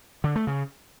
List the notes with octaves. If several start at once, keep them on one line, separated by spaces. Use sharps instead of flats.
D3
A3
C#3